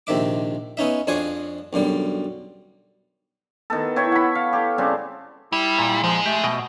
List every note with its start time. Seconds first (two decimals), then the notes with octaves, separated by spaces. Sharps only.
0.07 A#1 C3 D#3 E5 D6
0.77 B3 C#4 D#4 E5
1.07 F2 F3 D4 G#4 C#5 G#5
1.73 B1 F#2 D3 G3
3.70 D#3 B3 A4
3.96 E4 C#5 G5 C#6
4.12 F#5 B5
4.35 F5
4.53 G4 A4
4.78 C#3 G3 C4
5.52 G3 E4
5.79 A#2
6.04 F3 G#3
6.26 A3 G4
6.44 B2 D#5 G5